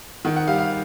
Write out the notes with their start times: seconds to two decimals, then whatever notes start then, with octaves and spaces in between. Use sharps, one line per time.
0.25 D#3 F#5
0.36 F#5
0.47 G3 F5
0.59 F5